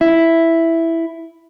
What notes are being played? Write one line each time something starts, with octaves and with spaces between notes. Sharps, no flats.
E4